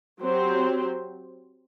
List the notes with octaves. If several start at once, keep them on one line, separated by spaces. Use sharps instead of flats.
F#3 C4 G4 C5